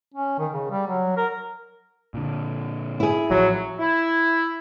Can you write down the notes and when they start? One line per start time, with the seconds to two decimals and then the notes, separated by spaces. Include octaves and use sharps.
0.14 C#4
0.39 D#3
0.53 C#3
0.71 G3
0.88 F#3
1.17 A#4
2.14 A#2 D3
3.00 E4 G#4
3.31 A1 F3 F#3
3.80 E4